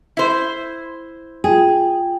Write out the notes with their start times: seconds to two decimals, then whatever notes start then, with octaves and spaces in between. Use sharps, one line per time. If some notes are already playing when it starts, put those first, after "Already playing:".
0.17 E4 C5
1.44 F4 G#4 G5